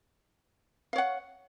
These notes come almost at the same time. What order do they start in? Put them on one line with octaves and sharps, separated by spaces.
F5 C#5 F#5